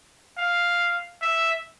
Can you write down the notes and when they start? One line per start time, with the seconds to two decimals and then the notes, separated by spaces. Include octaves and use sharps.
0.37 F5
1.22 E5